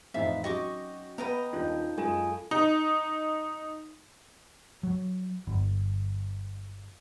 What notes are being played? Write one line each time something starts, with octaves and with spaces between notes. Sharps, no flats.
F2 A2 E3 C4 D#4 E5 F5
F#3 C#4 F#4 D#5 G5 C#6 D6 A#6
B3 B4 D#5 G5 A#5
D#1 D#3 D4 D#4 F4 G6
F#2 G#3 F4 G#4 A4 G#5 E7
D#4
F#3
G1